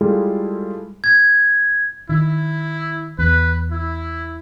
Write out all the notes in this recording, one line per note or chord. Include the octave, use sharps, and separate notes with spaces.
G3 G#3 E4 F4 G#4 A4
G#6
D#3 E4
E2 B4
E4